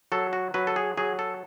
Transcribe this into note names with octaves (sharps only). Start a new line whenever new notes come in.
F#3 A4
F#4
F#3 B4
A4
G#4
F#3 G#4
A4